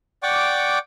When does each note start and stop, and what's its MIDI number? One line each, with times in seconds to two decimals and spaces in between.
0.23 0.78 74
0.23 0.78 78
0.23 0.78 79
0.23 0.78 85
0.23 0.78 86